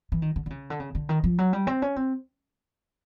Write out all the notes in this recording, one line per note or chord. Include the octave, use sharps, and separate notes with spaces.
E3
D#3
D3
D3
C#3
D3
C#3
D3
D#3
F3
F#3
G3
C4
C#4
C4